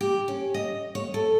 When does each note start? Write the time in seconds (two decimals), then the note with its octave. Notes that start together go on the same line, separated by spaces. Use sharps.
0.01 G4
0.28 C#4
0.54 D#5
0.95 C#5
1.14 A4